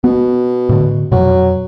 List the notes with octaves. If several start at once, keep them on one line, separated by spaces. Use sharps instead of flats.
B2 B3
A2 D3
F2 B2 F#3